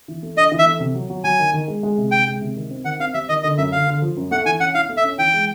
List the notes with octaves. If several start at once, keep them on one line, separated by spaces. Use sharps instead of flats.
E3
A3
D4 D#5
E3
E5
A3
C3
F#3
F#3
F#3 G#5
D#3
D#3
G#3
G#3
C3
C3 G5
G#3
C3
D#3
C4
D#3 F#5
C4 F5
G3 E5
D#3 D#5
D3 D#5
F#2 E5
D3 F5
D3
F3
F#2
A3 F#5
E3 G#5
C#4 F#5
E4 F5
A3
E5
C#4
E3 G5
G#3